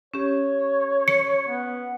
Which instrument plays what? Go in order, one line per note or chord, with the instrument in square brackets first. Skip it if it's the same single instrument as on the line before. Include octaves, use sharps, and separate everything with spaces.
[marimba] C#4 G4 [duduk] C#5
[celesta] C#7
[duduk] B3